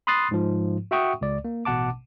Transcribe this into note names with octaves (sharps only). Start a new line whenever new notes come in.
B5 C6 D#6 F#6 A6 C7
G#2 F3
F#4 E5 F#5 G5 C#6 D#6
C#2 D5
A#3
A1 B2 F#5 A5 D6